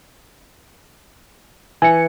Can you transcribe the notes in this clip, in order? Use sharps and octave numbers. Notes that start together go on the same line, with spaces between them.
E3 G#5 C#7